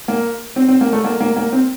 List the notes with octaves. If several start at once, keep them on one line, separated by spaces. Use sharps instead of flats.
A#3
C4
C4
A#3
A3
A#3
A#3
A#3
C4